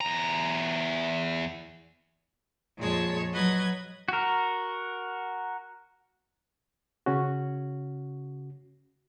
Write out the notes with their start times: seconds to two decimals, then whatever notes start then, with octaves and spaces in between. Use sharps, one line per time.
0.01 E2 A#5
2.78 F2 A#2 G#3 G#4 C#5 A5
3.33 F#3 B4 D#5 G#6
4.08 F#4 A#4
7.06 C#3 C#4 F#4